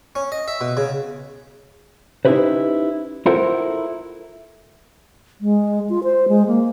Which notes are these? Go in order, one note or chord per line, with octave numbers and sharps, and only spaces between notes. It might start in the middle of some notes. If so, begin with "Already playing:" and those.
C#4
D#5
E5
B2
C#3
C#4 D#4 E4 G4 B4 C5
E4 F4 A4 A#4 C5 F#5
G#3
F4
C5
G#3
A#3